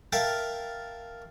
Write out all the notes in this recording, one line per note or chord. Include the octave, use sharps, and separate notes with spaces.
A#4 E5 F5 G5 A5